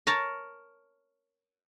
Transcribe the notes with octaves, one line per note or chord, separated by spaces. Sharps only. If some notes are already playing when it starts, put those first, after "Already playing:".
A#4 C#5 A5